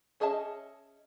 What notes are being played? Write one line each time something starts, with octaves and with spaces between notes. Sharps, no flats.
C#4 G#4 D#5 E5 A5